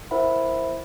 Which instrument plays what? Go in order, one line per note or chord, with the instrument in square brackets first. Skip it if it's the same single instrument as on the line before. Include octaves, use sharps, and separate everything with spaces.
[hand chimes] E4 A#4 C5 E5 F#5 B5